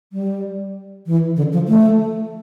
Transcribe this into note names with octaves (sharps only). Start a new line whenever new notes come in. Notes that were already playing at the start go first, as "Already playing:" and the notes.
G3
E3
D3
F3
A3